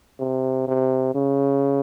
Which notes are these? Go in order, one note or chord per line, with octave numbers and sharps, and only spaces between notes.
C3
C3
C#3